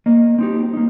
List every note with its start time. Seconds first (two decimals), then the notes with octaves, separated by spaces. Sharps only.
0.06 A#3 D#5
0.39 C4 D#4 G4
0.73 A#3 D#4